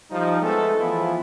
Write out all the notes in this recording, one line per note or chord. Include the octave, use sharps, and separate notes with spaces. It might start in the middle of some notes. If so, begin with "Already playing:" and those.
F3 G3 D#4
G#3 A3 B3 A4
E3 F3 B3 E4 F4